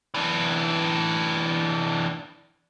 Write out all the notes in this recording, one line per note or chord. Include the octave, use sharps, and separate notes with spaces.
E3 D4